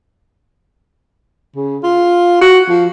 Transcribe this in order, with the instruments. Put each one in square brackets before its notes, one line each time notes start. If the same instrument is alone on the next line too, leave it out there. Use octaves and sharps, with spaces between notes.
[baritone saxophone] C#3
F4
F#4
F3